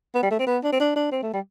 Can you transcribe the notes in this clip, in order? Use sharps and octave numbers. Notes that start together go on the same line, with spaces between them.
B3
G3
A3
C4
B3
D4
C4
D4
D4
C4
A3
G3